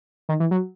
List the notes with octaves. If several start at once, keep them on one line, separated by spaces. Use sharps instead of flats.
D#3
E3
F#3